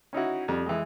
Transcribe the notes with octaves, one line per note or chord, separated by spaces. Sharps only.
C#4 D#4 E4 F#4
F2 G3
E3 G#3